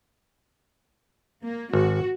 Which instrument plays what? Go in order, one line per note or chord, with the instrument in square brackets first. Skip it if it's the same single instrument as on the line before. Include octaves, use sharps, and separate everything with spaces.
[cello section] A#3
[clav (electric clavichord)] G#1 [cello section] F#4